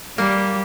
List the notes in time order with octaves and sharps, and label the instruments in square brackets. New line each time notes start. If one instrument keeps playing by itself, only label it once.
[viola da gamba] G3 [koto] A#3